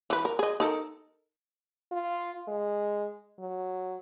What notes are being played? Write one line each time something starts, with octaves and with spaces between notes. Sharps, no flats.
E3 B4
A#4
G#4 D#5
D#4 A4 A#4
F4
G#3
F#3